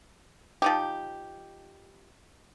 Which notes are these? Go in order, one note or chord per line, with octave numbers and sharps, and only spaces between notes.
F3 D#4 G4